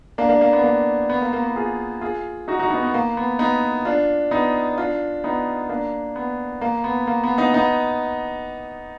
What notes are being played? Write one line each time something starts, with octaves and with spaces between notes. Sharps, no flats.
A#3 D4
A#3 D4
A#3
B3
A#3
B3
A#3
A#3
B3
F4 G#4
F4 G#4
D#4 F#4
D#4 F#4
B3 D#4
B3
A#3
B3
B3 D#4
D4 F4
B3 D#4
D4 F4
B3 D#4
A#3 D4
B3
A#3
B3
A#3
B3
B3 D#4
B3 D#4